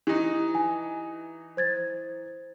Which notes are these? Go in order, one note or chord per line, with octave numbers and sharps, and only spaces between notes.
E3 D#4 G4
G#5
C5 G#6 A6